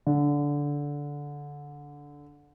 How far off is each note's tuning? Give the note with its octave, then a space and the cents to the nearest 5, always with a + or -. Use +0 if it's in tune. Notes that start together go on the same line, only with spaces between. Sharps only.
D3 -15